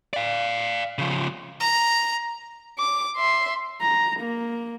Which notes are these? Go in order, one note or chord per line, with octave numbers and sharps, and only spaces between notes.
D5 F5
C#3 F3
A#5
D6
E5 C6
A#5
A#3